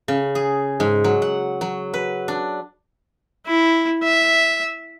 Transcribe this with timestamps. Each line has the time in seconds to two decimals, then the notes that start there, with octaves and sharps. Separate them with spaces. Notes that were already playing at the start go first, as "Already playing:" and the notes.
0.08 C#3
0.35 G#4
0.80 G#2
1.04 F#3
1.22 F#5
1.61 F#3
1.94 B4
2.28 D4
3.46 E4
4.03 E5